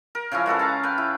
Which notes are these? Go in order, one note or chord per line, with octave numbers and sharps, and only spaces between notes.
A#4
C#3 F3 C#4 E4
G#3 F#4 A4 B4
F5 A5 A#5
B4 F5 G5
E4